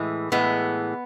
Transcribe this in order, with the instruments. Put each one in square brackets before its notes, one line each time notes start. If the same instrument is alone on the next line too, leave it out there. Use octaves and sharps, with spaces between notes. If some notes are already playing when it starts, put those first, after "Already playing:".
Already playing: [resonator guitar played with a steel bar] A2 E3 G#3
A2 E3 G#3 B3